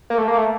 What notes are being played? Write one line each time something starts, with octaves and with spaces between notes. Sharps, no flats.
A#3
A3
A#3
A3